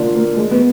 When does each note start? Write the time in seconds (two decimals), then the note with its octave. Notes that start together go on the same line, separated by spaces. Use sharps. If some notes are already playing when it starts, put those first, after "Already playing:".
Already playing: D3 A#3 D4 F4
0.15 A#3
0.37 G#3
0.51 B3